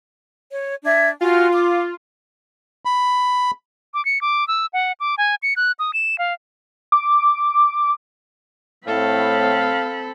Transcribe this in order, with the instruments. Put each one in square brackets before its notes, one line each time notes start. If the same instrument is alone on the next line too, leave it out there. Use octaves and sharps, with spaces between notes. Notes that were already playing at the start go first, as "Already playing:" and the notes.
[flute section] C#5
D4 E5 G#6
[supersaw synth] F4 [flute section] F#4 G#5 F6
[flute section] D6
[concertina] B5
[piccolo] D6
C#7
D6
E6
F#5
D6
G#5
C#7
F#6
D#6
E7
F5
[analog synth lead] D6
[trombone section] A2 [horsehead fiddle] C4 B5 [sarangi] A4 [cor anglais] F5